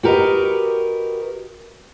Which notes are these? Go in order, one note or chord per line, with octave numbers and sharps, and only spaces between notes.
F#4 G4 A#4 B4 D#5